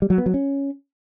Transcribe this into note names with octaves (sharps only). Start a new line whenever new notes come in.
G3
F#3
B3
F#3
C#4